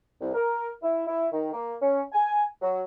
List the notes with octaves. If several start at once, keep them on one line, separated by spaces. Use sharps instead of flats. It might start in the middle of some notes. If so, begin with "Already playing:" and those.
C2
A#4
E4
E4
D#3
A#3
C#4
G#5
F#3